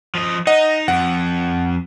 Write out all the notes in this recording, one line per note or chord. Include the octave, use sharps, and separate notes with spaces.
F3 D#5
D#4 D#5 F#5
F2 F#5